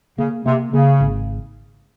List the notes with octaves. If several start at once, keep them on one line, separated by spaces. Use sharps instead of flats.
C#3 A#3
C3 A#3
C#3 A#3
G#1